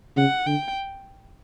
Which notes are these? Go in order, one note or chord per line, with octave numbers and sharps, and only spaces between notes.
C#3 F#5
D3 G5